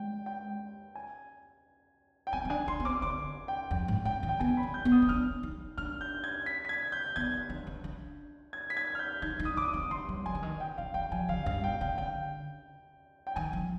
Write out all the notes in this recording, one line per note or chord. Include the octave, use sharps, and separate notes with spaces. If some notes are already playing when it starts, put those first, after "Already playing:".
Already playing: G#3 G5
G5
G#5
G5
C4 G#5
C4
D4 G#5
D4 C6
B3
C4 D6
D3 D6
G5
F2 G5
G#2
C3 G5
D#3
G5
B3 G#5
B5
B3
G6
B3
D#6
C4
D4 F6
D#4
D4 F6
G6
G#6
B6
B6
G#6
G6
B3 G#6
D4
D4
D4
G#6
B6
G#6
F6
G6
D#4 G#6
D#4
D#6
D#4 D6
D#6
C4
D4 C6
G3
F3 G#5
D3
D#3
G5
C3 F5
D#3 G5
F3 G#5
D3 F5
G2 F5
B2 G5
C3 G5
D3 G5
G5
D#3 G#5
F3